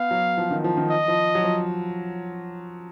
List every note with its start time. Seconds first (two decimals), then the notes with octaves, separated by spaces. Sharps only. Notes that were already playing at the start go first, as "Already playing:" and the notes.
Already playing: B3 F5
0.11 F#3
0.37 F3
0.51 D#3
0.64 F3
0.77 D#3
0.90 D#5
1.08 F3
1.35 F#3
1.44 F3